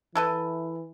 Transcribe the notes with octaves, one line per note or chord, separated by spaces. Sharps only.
E3 E4 A4 B4